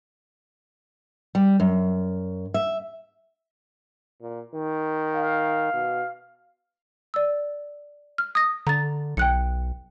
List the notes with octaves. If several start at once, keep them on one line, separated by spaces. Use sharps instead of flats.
G3
F#2
E5
A#2
D#3
F5
B2
D5 E6
F6
D#6 A#6
D3 A#5 A6
B1 G5 F#6 C#7